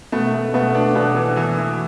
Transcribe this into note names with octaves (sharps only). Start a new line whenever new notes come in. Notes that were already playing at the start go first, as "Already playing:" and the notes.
B2 A3 B3
A3
B2 A3 B3
D4
B2 B3 D4
E3
E3
E3